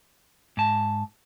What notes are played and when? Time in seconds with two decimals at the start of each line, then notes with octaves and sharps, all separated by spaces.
0.57 G#2 A5